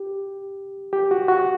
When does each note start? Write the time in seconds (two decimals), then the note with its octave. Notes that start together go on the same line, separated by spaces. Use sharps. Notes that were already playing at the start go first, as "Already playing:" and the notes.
Already playing: G4
0.93 G4
1.11 F#4
1.28 F#4